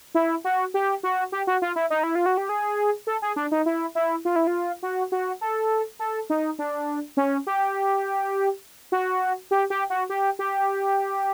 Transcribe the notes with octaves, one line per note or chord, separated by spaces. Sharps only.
E4
F#4
G4
F#4
G4
F#4
F4
E4
D#4
E4
F4
F#4
G4
G#4
A4
G#4
D4
D#4
E4
E4
F4
E4
F4
F#4
F#4
A4
A4
D#4
D4
C#4
G4
F#4
G4
G4
F#4
G4
G4